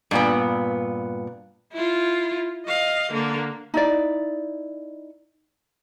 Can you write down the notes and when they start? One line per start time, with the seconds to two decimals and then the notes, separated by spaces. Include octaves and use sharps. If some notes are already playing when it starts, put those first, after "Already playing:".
0.11 G2 A#2 B3
1.73 E4 F4
2.66 D#5 F5
3.13 D3 A#3
3.74 D#4 E4 D5